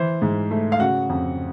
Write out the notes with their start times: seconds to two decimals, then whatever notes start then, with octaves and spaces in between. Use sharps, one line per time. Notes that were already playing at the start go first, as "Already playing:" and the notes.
Already playing: E3 C5
0.22 G#2
0.51 A3
0.72 F5
0.80 C#3 F#4 F#5
1.10 F2